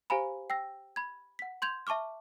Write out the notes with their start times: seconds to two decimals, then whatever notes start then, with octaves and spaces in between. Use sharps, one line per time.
0.10 G4 C5 F5 G#5 A#5 B5
0.50 G5 E6 A#6
0.96 B5 G#6
1.39 F#5 B6
1.62 C6 G6 G#6 F7
1.87 E5 A5 C#6 D6 F6